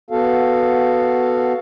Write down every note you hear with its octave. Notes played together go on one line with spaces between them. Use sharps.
B3 F#4 A4 F5